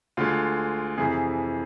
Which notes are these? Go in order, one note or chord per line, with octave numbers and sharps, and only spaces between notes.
D2 D3 G#3 F4
F2 C3 E3 G#4